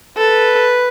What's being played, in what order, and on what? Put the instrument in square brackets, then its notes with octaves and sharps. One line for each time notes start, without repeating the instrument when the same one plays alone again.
[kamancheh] A4 [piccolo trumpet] B4